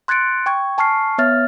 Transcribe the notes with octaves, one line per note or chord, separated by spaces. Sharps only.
C6 F#6 G#6 A6 C#7 D7
G5 C#6 G#6
G#5 A5 C#6 F6 C7
B3 C#5 E5 F6 A6